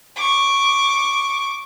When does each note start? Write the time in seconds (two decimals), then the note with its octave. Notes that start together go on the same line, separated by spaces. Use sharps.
0.16 C#6 D6